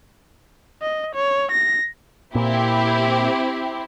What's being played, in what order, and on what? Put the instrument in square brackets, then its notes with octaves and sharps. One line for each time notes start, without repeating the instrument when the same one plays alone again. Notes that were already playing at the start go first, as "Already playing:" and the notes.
[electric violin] D#5
C#5
A#6
[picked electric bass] A#2 [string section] C4 E4 G4